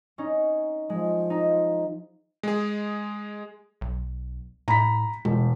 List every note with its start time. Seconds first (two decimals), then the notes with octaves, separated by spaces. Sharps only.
0.18 C#4 D#4
0.90 F3 G#3
1.30 D#4
2.43 G#3 G#4
3.81 B1
4.68 A2 A#5 B5 B6
5.25 E1 G#3